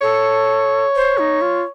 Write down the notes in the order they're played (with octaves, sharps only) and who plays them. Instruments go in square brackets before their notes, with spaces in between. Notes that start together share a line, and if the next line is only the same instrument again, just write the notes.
[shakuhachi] A4 [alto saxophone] C#5
[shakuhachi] C5
D#4
F4